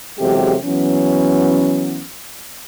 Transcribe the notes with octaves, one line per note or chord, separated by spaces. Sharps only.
E2 C3 F#3 G#3 G4 A4
E3 F#3 B3 C#4